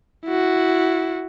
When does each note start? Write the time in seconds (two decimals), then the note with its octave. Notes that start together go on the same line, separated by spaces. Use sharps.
0.25 E4 F#4